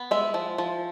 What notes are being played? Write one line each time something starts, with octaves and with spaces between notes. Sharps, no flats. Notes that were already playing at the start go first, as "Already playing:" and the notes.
Already playing: B3
G#3 E5
F3
F3